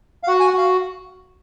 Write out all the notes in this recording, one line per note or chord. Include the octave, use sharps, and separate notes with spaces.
F5
F#4 F#5
G#5
F#5
F#4 F5